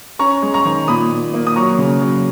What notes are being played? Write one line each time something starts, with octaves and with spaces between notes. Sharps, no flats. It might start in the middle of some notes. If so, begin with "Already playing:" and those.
C#4 A#5 C#6
G#3
A#5 C#6
D#3
A#2 B5 D#6
A#2
A#3
D#6
F#3 A#5 C#6
C#3
F#3